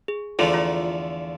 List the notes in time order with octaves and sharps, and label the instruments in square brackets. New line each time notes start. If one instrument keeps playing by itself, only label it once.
[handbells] G#4
[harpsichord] E2 D3 F3 A3 [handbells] F4 A4
[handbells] F4